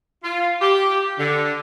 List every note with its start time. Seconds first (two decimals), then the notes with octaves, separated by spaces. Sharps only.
0.24 F4
0.61 G4
1.19 D3